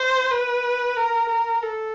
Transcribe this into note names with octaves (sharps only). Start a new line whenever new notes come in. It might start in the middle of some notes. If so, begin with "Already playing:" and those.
Already playing: C5
B4
A#4
A#4
A4